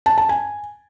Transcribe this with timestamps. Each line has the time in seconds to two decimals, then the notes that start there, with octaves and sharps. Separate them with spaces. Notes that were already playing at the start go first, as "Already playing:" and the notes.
0.06 A5
0.18 A5
0.29 G#5